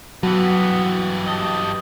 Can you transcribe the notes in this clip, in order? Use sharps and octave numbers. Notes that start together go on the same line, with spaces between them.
G2 E3 F#3 B3 F#4
G4 D#5 A5